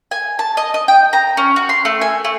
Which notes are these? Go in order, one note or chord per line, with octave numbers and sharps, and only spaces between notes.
G#5
A5
D#5
D#5
G5
A#5
C#4
F#4
C6
A3
G#5
A3